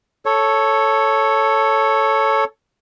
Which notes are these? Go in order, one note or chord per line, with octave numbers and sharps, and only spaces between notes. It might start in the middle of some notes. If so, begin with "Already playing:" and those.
A4 C#5